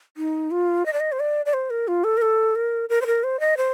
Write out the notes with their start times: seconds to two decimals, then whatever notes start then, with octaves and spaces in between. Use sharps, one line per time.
0.17 D#4
0.51 F4
0.86 D#5
0.93 D5
1.00 D#5
1.12 C5
1.19 D5
1.46 D5
1.53 C5
1.70 A#4
1.88 F4
2.04 A4
2.17 A#4
2.22 A4
2.55 A#4
2.89 A#4
3.01 C5
3.06 A#4
3.23 C5
3.40 D#5
3.57 C5